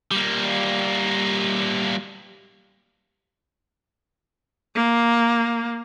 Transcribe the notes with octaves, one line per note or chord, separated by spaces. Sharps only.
G3 A#3
A#3